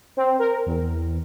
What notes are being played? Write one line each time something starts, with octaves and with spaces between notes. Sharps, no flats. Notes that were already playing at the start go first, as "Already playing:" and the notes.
C4
A#4
E2